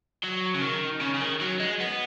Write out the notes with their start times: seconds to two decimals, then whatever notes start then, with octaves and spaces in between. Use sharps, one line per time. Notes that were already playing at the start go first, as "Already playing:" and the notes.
0.23 F#3
0.54 C#3
0.62 D#3
1.01 C#3
1.14 C#3
1.21 D#3
1.41 F#3
1.60 G#3
1.80 B3